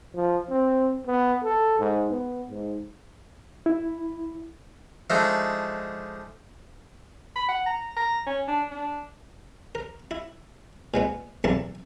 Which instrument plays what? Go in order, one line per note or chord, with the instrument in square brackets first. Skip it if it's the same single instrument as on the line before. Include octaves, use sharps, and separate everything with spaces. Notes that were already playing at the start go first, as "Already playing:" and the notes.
[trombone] F3
C4
B3
A4
G#2
B3
G#2
[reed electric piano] E4
[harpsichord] F3 G#3 A3 D4 D#4
[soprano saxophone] B5
F#5
A#5
A#5
C#4
D4
D4
[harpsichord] A#4
E4
A#2 G#3 B3
B1 E2 A#3 E4 A5